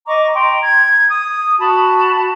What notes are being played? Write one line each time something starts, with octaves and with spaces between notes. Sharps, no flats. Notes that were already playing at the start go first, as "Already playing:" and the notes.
D#5 A#5 C#6 D6
G5 A#5 C6
G#6
D#6
F#4 A5 B5